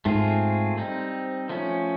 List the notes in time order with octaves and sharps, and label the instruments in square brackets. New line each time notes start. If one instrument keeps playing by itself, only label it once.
[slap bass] G#2 [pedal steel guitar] A3 C4 F4 G#4
[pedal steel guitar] G3 C4 D#4
F3 A3 C#4